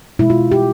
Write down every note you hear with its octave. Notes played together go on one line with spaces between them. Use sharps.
B2 G#3 E4
F4
G4